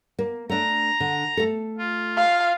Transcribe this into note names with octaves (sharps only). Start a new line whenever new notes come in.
A#3
A3 D4 A#5
D3
A3 A4
F4
F5